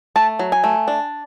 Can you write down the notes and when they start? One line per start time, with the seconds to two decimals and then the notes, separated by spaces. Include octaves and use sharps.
0.16 A3 A5
0.39 F#3
0.52 G#5
0.64 A3
0.88 D4